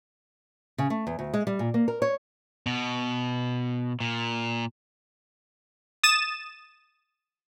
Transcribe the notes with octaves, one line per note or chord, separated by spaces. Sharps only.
C#3
A3
E2
D2
G#3
G3
A#2
A#3
A#4
C#5
B2
A#2
D#6 A6 E7